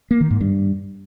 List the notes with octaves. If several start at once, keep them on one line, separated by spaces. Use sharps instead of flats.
A#3
D#3
G#2
G2